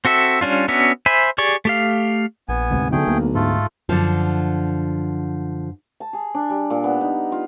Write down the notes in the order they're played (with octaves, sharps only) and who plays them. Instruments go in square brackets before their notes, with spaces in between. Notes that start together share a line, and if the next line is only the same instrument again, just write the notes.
[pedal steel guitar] C4 F#4 A4 E5
G3 C#4 D4 F4
B3 C#4 D4 F#4 E5
C5 E5 G#5 B5
G4 G#4 D5 C#6
A3 G4 F5
[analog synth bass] A#1 [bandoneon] B3 G#5
[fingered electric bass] D2 G#2 C3
[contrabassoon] B1 [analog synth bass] D3 [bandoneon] A3 G#4 G5
[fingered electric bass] D2 [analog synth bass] A#3
[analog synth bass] G#2 [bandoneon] A3 F4 A4
[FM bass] F#2 [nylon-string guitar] D3 F3
[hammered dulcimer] A5
G#4
D4
G3
A#2
B3
D#4
F4